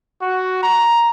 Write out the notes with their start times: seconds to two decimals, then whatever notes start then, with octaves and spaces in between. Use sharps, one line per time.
0.22 F#4
0.63 A#5